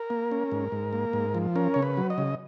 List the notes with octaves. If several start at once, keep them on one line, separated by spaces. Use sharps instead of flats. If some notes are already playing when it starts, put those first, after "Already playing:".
Already playing: A#4
A#3
C#4
G#2
G#2
A#3
G#2
F3
C#4 A#4
C#3 C#5
B4
F#3
D#5
C#3